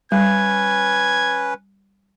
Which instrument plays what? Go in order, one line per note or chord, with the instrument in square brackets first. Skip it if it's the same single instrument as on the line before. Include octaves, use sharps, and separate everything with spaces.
[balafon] G3 [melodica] C#4 B4 [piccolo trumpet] G#6